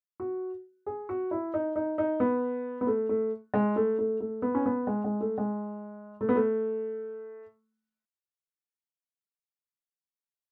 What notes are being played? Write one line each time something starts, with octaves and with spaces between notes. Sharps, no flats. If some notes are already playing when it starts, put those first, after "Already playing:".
F#4
G#4
F#4
E4
D#4
D#4
D#4
B3
B3
A3
A3
G#3
A3
A3
A3
B3
C#4
B3
G#3
G#3
A3
G#3
A3
B3
A3